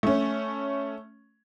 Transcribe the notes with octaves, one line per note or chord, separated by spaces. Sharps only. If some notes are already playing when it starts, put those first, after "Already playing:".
A3 C#4